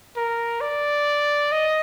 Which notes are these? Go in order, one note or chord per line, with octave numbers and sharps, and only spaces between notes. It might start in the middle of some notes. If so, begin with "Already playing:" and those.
A#4
D5
D#5